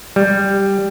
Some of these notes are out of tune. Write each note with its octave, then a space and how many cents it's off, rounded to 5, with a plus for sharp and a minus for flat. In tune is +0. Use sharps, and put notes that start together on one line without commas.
G3 +5